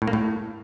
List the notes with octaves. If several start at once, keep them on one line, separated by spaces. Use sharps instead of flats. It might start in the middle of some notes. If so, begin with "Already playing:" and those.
A2
A#3
A2